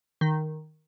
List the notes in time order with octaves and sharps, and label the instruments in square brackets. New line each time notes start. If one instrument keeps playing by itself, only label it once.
[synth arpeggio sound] D#3